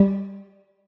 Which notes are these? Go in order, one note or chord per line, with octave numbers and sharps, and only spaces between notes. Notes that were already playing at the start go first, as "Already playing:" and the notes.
Already playing: G3